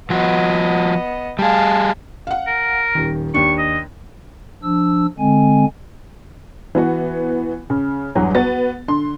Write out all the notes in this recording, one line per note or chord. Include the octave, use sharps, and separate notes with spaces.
F3 B3 F#4 D#5
G3 G#4 F5 A5
F5 F#5
A#4
D#1 D#3
D#2 D4 C#6
D#5
F3 D4 E6
D3 G#3 C4 G#5
E3 B3 F#4
C#3
E2 G2 F#3 F#4
B3 F#4 A6
D3 C6